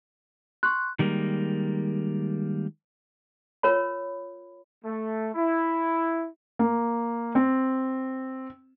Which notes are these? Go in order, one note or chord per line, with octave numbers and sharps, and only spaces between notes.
C6 C#6 F#6
D#3 G3 G#3 A#3
F4 A#4 C#5 B5
A3
E4
A#3
C4